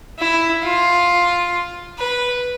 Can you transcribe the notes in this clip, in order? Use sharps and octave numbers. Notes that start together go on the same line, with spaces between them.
E4
F4
B4